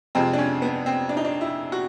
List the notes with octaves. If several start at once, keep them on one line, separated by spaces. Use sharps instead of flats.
F2 C3 F3 G#3 C4
D4
C#4
B3
C4
D4
D#4
D4
E4
F#4